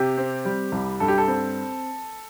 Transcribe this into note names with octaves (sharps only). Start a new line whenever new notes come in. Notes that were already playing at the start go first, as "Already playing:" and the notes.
Already playing: C3 G4
C4
G3
C2
G2 A4
G4
A4
C4